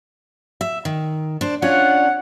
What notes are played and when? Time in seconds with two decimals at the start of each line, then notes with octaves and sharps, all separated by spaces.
0.61 E5
0.85 D#3
1.41 D4 C5
1.62 C#4 D4 F4 C#5 F#5